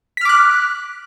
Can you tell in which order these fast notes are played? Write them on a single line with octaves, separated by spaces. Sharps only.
B6 F6 D6 F#6